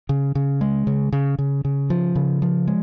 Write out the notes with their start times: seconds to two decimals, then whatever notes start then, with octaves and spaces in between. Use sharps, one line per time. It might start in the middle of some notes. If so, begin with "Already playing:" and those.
0.09 C#3
0.35 C#3
0.61 G#3
0.87 C#3
1.12 C#3
1.38 C#3
1.65 C#3
1.90 F3
2.15 C#3
2.42 F3
2.67 G#3